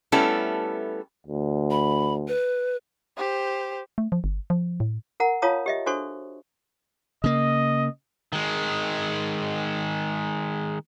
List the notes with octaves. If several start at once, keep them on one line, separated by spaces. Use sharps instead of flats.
G3 A3 B3 C#4 E4 A4
D2
B5
B4
G4 C5
A3
F3
G1
F3
A2
A#4 F#5 A#5
F4 C#5 F5 A5 A#5 D#6
G4 D#5 E5
D4 F#4 A4 C5 C#6
C#3 A#3 D#5
D#3 G#3